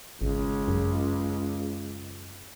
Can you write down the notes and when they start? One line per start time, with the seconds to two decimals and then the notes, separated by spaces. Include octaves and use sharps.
0.21 G#1 C#2
0.68 F#2